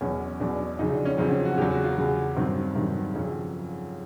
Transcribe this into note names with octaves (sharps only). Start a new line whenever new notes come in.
E2 B2 F#3 C#4
E2 B2 F#3 D4
F2 C#3 F#3 D#4
D4
C#4
F2 C#3 F#3 C4
C#4
F#4
E2 C#3 F#3 G4
F#4
F4
E2 C#3 F#3
G2 D#3 F#3 C4
G2 D#3 F#3
F2 C#3 F#3 C#4